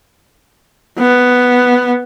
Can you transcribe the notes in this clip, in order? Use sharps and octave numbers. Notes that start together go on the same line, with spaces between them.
B3